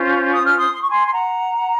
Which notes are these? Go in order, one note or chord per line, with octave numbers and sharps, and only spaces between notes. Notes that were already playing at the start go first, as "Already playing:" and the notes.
Already playing: C#4 F4 C5
D#6
F6
C6 D#6
C6
C#6
G#5 C6
C6
F#5 A#5